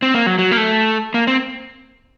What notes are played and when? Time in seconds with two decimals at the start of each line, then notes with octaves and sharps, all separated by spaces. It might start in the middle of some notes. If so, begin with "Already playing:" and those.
0.02 C4
0.14 A#3
0.26 F#3
0.39 F#3
0.51 A#3
0.57 A3
1.14 A#3
1.27 C4